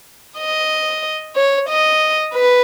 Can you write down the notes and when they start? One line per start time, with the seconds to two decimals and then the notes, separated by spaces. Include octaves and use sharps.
0.38 D#5
1.36 C#5
1.69 D#5
2.34 B4